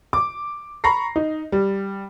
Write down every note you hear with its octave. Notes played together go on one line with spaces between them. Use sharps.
D6
A#5 B5 C#6 A#6 C7
D#4
G3